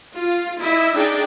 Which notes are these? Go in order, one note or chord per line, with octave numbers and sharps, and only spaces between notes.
F4
E4 D#5 E5
D4 D#4 G#4 D5 G5